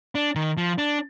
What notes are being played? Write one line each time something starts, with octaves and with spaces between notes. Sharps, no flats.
D4
D#3
F3
D4